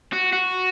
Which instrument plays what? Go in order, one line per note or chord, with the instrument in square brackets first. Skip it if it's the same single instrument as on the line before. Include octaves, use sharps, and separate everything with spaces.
[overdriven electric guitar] F#4
F#4